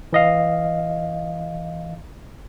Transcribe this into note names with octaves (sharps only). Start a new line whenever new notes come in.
E3 D#5 F5